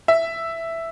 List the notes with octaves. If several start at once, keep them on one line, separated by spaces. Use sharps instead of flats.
E5